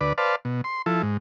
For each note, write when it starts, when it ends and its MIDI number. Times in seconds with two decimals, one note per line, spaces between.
0.01 0.13 38
0.01 0.13 71
0.01 0.13 74
0.18 0.36 71
0.18 0.36 72
0.18 0.36 74
0.18 0.36 77
0.18 0.36 81
0.45 0.61 47
0.64 0.82 84
0.86 1.02 53
0.86 1.02 64
0.86 1.02 69
1.03 1.17 44